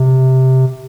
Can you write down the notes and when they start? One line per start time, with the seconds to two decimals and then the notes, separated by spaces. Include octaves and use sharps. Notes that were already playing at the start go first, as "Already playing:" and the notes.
Already playing: C3